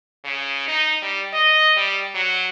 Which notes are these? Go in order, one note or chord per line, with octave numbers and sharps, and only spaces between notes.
C#3
D#4
G3
D#5
G3
F#3